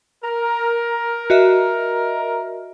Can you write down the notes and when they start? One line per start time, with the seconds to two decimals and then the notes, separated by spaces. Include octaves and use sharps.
0.24 A#4
1.30 F#4 D#5 E5